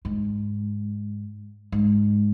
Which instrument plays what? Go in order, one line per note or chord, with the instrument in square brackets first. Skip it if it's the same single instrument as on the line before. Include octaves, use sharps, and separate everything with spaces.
[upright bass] G#2
G#2